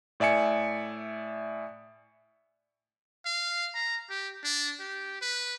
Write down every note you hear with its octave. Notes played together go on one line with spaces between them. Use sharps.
A2 D5 E5 G#5 C#7
F5
A#5
G4
D4
G4
B4